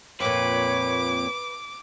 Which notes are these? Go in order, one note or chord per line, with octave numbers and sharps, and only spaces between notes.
F2 A#2 B4 C#5 D6